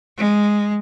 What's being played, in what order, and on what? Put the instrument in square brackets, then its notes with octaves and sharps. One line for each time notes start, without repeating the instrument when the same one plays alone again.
[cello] G#3